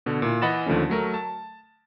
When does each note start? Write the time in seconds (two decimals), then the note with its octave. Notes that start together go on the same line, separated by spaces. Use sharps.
0.06 B2 D3
0.22 A#2 E4
0.42 E3 D#5 F#5 B5 A6 E7
0.66 D#2 D3 F3 A3 C#4
0.90 F#3 A3 A#4
1.14 A5